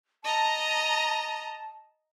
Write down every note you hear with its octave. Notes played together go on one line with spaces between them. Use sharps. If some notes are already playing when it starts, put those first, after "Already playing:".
D#5 A5 A#5